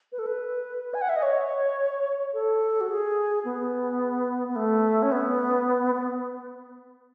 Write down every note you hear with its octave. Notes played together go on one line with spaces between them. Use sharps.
B4
A4
B4
G#5
F#5
E5
D#5
C#5
A4
F#4
G#4
B3
B3
A3
C#4
B3
B3